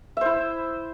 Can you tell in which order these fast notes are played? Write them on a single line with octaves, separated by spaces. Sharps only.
E5 C5 E4